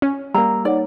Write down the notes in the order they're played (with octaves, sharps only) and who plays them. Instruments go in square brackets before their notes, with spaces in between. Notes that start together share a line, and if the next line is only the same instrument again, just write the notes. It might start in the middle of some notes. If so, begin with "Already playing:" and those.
[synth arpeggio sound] C#4
[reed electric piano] G3 A#3 [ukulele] A#5 [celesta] E6
[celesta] D#4 C#5 F#5 [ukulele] D5